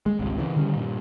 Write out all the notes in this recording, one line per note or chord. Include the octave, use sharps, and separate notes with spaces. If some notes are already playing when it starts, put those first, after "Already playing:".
G#3
G#1 C#2 C3
C#3 E3
D3 D#3 G3 C#4
G2 A#2